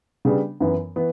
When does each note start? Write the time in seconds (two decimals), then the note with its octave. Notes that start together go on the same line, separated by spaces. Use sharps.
0.25 C#3 G3 B3 D4
0.60 F#2 E3 B3
0.96 E3 B3